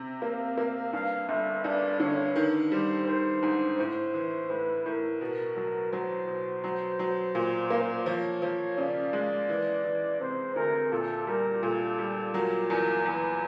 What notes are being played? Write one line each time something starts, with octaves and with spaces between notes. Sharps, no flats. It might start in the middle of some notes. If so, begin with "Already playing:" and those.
Already playing: C3
A#3 F5
A#3
G2 F5
G1 E5
G2 D5
D3 C#5
D#3
G3 C5
D#3 C5
G#2
A2 C5
E3
A2 B4
A2 A#4
B2 A#4
F#3
F#3 C5
B2
F#3
F#3
A#2
A#3
F3 C#5
F3
C#3 D5
G#3
E3
E3
C3 C5
D2 A#4
A#2 A4
G3 A#4
A#2 A4
G3
F#3 A#4
E2 A#4
E2 B4